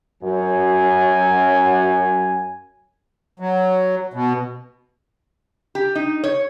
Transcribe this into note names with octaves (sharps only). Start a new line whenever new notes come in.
F#2 F#3 G#5
F#3
B2
G4
D#4
C#5